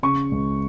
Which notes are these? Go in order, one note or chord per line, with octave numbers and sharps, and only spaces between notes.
C#3 C#6
C#2